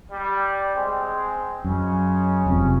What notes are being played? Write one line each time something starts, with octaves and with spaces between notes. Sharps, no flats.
G3
G#3 C4
F#2 C#3 G#3 C#4
F1 F2 C3